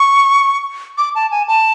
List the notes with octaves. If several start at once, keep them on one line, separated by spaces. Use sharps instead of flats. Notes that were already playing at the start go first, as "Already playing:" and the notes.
Already playing: C#6
D6
A5
G#5
A5